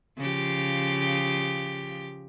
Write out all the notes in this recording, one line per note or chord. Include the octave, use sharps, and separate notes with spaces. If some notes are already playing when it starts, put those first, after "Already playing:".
C#3 F3 G4